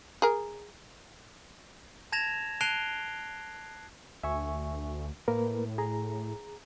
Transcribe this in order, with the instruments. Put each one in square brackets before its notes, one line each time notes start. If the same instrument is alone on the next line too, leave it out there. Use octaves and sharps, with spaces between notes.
[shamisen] G#4 A#4
[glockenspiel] A5 G#6 A#6 E7 F7
A5 F#6 C7 D7 F7 G7
[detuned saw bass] D2 [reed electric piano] E5 G#5 C#6
[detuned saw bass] A2 [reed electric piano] A#3 A#4 B4
[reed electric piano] G#4 A#5